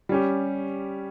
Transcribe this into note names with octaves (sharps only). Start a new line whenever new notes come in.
G3 C#4 G4